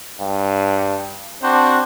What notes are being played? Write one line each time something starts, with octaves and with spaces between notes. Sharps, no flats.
G2
C4 D4 F#4 C5